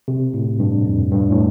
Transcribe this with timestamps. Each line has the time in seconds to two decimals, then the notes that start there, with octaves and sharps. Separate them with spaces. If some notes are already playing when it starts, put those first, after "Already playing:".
0.08 C3
0.34 A2
0.59 G2
0.85 F2
1.12 G2
1.30 A2